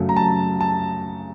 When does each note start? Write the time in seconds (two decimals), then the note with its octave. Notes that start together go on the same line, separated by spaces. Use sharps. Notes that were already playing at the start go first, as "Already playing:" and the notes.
Already playing: F#2 C#3 F#3 A3
0.09 A#5
0.17 A5
0.61 A5